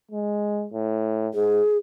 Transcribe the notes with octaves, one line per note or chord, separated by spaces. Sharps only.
G#3
A2
G#2 G#4